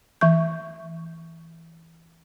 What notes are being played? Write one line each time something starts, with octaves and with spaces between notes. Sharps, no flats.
E3 E5 C#6 G6